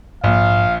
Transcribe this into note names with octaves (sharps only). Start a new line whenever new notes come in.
A#1 G#2 A#3 F5